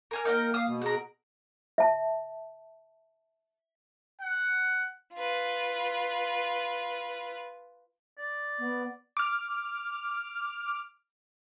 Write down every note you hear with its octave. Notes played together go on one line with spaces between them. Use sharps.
A#4 G#5 F6
A#3 D#4 A#4 F#5 G5
F5 D#6
B2
G#4 A#4 F#5
E5 A5
F#5
F4 B4
D5
B3
D6 F6